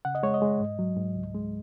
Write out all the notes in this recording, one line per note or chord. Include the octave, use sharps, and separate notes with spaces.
C#3 F#5
D#5
G#3 C#5
D#5
G#3
G#2
F#3
G#2
C#2
G#3